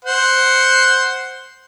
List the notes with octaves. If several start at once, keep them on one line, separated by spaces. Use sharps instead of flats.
C5 F#5